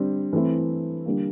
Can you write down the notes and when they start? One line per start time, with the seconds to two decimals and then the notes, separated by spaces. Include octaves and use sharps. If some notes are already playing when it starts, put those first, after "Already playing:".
Already playing: D3 G3 C4
0.33 E3 A3 C4 E4
1.06 D3 G3 A#3